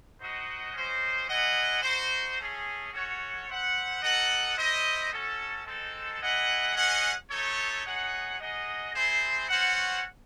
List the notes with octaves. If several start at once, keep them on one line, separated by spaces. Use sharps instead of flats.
D#4 F#4 C5 D#5 F#5
C#4 F#4 C5 D#5
E4 G#4 D#5 F#5
D#4 F#4 C5
A3 C#4 G#4
C#4 F#4 A4 C#5 F#5
E4 C5 F#5
D#4 A4 D#5 F#5
E4 C5 D#5
C#4 F#4 A4
G#3 C4 D#4 A4
E4 G#4 D#5 F#5
C#4 G#4 D#5 F#5
A3 D#4 A4 C#5
D#4 G#4 C#5 F#5
D#4 G#4 D#5 F#5
C4 E4 G#4 C5
C#4 F#4 C5 F#5